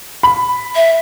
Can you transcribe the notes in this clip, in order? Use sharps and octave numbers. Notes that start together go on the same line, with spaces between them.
B5
E5